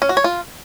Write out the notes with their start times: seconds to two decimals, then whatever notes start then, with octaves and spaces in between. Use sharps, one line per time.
0.02 C#4
0.09 F#4
0.17 C#5
0.24 F4